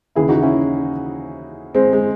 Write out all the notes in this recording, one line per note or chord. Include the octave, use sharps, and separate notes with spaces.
D#2 C#3 E3 E4 G#4
D#4 F#4
C#4 E4
G#3 C4
G#3